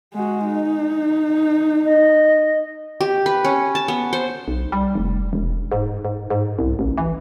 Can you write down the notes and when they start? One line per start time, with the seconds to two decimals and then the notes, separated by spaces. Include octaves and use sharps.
0.14 G#3 F#4
0.46 D#4
1.85 D#5
3.01 G4
3.26 B4
3.45 C#4
3.75 A5
3.88 B3
4.13 C5
4.48 B1
4.72 G3
4.95 F1
5.33 E1
5.72 G#2
6.05 G#2
6.30 G#2
6.59 C2
6.79 A1
6.98 E3